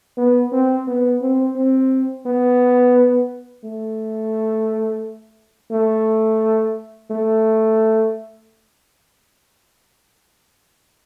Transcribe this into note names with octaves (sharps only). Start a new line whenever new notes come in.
B3
C4
B3
C4
C4
B3
A3
A3
A3